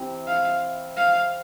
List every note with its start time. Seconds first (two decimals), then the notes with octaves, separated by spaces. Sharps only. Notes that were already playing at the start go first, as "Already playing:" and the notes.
Already playing: C3 E3 C4
0.28 F5
0.97 F5